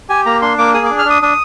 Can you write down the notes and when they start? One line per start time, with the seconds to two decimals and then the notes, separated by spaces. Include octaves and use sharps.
0.09 G4 G#5
0.26 A#3 A#5
0.42 D4 C6
0.58 A#3 D6
0.74 G#4 D#6
0.86 D6
0.90 D4
0.98 F6
1.05 D4 D#6
1.22 D4 D#6